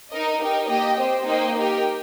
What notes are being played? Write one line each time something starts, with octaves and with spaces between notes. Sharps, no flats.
D#4 A#4 D#5
D#4 G4 A#4 G5
A#3 G4 D#5 G5
C4 G4 C5
A#3 D#4 C5 D#5 G5
D#4 G4 A#4 G5